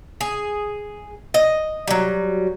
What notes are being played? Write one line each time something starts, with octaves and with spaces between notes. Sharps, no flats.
G#4
D#5
F#3 G3